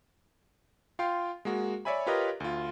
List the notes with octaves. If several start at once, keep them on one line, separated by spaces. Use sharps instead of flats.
F4 F5 G5 C6
G#3 A#3 F#4
C#5 D5 E5 G#5 B5
F4 G4 A#4 B4 C#5 D#5
D2 F4